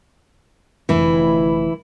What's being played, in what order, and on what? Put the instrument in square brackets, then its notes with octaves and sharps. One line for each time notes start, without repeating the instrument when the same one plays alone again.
[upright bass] F1 D3 [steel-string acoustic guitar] E3 E4